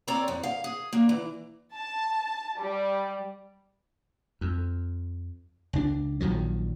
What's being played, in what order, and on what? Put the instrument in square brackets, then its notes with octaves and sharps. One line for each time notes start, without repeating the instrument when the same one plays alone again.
[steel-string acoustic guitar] C4 A4 C#5 D5 A#5
F2
F5
G#4
A#3 D4
E3
[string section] A5
G3
[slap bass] F2
C#2 D4
A#1 D#3 F3 F#3